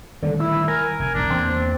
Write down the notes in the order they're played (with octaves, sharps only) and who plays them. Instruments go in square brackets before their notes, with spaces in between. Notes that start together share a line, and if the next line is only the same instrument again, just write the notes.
[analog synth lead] D3 [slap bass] D#3 G3 A3
[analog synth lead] E4 [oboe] E6
[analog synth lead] A#4 [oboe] G#5
[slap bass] F1 [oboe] G#5
[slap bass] F1 B1 [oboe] D4
[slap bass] E2 E3 A#3 [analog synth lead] C4